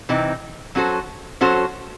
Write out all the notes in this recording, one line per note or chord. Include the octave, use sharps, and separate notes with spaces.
C3 E3 C4 D#4
F#3 C#4 F#4 A4 C5
F#3 C#4 F#4 A4 C5